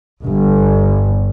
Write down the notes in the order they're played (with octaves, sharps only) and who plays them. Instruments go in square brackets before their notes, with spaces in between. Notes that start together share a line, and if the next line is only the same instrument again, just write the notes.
[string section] G1